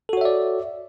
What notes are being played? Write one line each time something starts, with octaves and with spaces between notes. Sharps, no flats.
F#4 A4 C#5 D5 E5